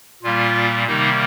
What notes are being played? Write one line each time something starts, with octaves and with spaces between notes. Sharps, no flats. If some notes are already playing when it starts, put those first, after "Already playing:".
A#2 G3 A#3 F4
C3 D#3 G3 A#3 D#4